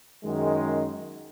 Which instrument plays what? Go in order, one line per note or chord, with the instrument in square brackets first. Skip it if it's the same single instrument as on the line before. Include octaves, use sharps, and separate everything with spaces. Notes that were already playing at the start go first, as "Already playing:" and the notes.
[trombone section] F#2 D#3 G#3